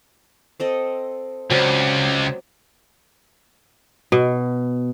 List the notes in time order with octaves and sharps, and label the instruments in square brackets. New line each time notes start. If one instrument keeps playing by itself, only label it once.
[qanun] C4 A4 D#5
[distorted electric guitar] C#2 [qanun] F#3 C4 D5
[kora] B2